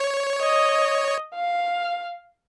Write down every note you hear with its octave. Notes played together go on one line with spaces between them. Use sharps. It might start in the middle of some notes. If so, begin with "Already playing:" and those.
Already playing: C#5
D#5
F5